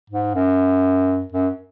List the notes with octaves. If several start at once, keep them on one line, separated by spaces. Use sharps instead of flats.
G#2
F#2
F#2